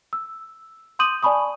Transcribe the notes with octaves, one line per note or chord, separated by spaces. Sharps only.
E6
C6 D6 D#6 G6 D#7 F#7
D5 G#5 A5 B5 C#6 D#6